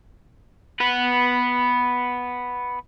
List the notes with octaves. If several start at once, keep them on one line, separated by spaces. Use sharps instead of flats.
B3 B4